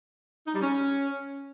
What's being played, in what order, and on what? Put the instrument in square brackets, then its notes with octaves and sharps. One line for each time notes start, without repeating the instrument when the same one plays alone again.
[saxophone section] D#4
G3
C#4